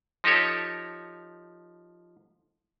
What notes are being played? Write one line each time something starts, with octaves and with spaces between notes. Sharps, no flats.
F3 D#4 G4 A4 C#5